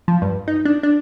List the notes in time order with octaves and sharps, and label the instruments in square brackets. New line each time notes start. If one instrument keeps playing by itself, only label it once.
[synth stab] F3
G2
D#4
D4
D4